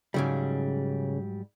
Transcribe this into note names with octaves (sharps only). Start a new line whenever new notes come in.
G#2 C#3 F#3 G3